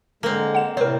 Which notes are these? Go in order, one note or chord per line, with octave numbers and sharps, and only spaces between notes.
D3 G#3 A#3 C4
F#5 E7
A2 C3 G3 C4 A#4 C#5